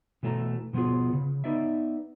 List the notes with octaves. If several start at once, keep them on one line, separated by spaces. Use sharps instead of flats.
B2 E3 A3 C#5 A#5
B2 F3 B3 F4 G#4
C#3
B3 D#4 D5 E5